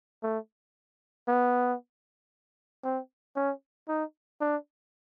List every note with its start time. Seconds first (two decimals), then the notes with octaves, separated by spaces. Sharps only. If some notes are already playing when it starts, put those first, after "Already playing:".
0.23 A3
1.28 B3
2.84 C4
3.36 C#4
3.89 D#4
4.41 D4